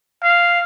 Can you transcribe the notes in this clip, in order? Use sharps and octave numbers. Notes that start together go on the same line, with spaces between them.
F5